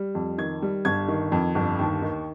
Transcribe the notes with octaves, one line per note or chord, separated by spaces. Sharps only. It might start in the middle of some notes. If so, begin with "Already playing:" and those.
Already playing: G3
F2
D#3 G#6
G3
G1 G#6
D#3
F2
G1
D#2
D#3